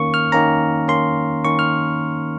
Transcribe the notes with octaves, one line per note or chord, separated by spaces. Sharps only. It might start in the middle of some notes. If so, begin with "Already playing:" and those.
Already playing: D#3 A#3 C#4 C#6
F6
D#3 A#3 C#4 A#5
D#3 A#3 C#4 C6
D#3 A#3 C#4 C#6
F6